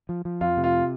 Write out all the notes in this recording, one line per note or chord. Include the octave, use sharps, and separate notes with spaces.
F3
F3
F2 F4
C3
F4